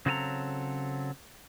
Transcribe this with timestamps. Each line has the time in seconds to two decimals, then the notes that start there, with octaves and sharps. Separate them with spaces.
0.06 C#3 F#3 C4 A4 G#5 A#5